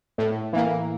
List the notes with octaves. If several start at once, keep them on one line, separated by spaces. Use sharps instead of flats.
A2
E3 A#3